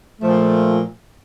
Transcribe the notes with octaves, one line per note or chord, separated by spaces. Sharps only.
A#2 F3 A3